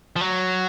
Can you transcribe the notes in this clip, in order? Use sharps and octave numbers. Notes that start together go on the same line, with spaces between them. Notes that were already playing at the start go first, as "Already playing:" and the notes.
F3
F#3